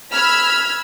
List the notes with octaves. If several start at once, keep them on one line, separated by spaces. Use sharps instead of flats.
B5 E6 F6 G#6 B6